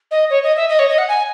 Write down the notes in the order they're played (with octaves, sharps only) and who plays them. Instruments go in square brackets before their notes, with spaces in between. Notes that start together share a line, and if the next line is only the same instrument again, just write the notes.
[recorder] D#5
C#5
D#5
E5
D#5
C#5
D#5
F#5
G#5